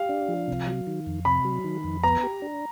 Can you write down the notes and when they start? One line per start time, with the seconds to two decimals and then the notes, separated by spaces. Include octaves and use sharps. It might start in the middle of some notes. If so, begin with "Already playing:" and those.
Already playing: G4 F5
0.09 D4
0.28 F3
0.48 C3
0.67 F#3
0.87 D#3
1.07 F2
1.25 C3 B5
1.45 F#3
1.64 D#3
1.84 F2
2.03 B3 A#5
2.23 G4
2.42 D4